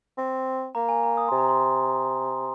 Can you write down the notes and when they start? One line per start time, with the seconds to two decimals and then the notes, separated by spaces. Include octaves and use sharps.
0.17 C4
0.75 A#3 A#5
0.89 G#5
1.03 A#5
1.17 D#6
1.28 C3 C6
1.38 A#5
1.49 C6